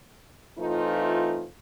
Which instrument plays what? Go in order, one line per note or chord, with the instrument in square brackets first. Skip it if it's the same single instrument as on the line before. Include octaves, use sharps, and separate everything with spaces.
[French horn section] E3 A3 C4 D#4 F4